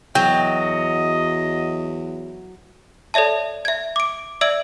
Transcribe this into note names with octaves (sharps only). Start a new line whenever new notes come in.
E2 F#3 D#5 G5
A4 C#5 D5 E5 A5
E5 G#6
D6 D7
D5 E5 E6 G#6 D7 F#7